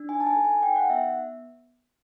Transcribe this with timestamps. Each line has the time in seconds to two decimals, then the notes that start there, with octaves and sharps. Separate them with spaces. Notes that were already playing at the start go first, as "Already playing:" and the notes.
Already playing: D4
0.09 D#4 G#5
0.20 A5
0.27 G#5
0.36 A4
0.45 G#5
0.62 D#4 G5
0.76 F#5
0.90 B3 E5